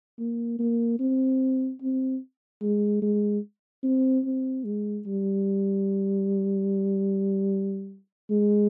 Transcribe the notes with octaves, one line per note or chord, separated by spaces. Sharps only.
A#3
A#3
C4
C4
G#3
G#3
C4
C4
G#3
G3
G#3